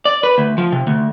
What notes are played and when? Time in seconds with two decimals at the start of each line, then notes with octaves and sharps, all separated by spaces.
0.05 D5
0.23 B4
0.38 D2
0.58 F3
0.72 C3
0.87 D2